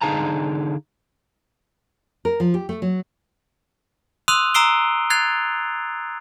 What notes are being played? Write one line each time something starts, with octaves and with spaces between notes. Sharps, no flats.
D3 D#4 G#4 F5 A5 A#5
A#4
F3
G4
A3
F#3
C6 D#6 E6 F#6 D#7 F7
A#5 D#6 E6 C7 D7 G7
F#6 G#6 A6 C7 F7